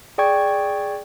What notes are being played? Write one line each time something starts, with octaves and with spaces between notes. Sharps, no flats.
G#4 D5 G5 C#6 G#6